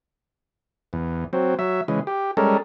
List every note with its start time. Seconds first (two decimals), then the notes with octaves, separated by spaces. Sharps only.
0.93 E2
1.33 F#3 C4
1.59 F#3 E5
1.88 C#3 E3 G#3
2.07 G4
2.37 G3 G#3 C#4 A4 A#4